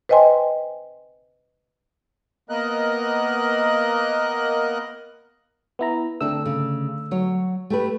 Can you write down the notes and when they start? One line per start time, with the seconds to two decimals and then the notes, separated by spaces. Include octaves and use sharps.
0.09 B4 C5 D#5 G5 G#5 C6
2.49 A#3 B3 A#4 D#5 F#6
5.79 B3 E4 A#5
6.21 D3 A3 C4 D4 A4 E6
6.46 C#3
7.11 F#3 C#5
7.70 A3 G4 B4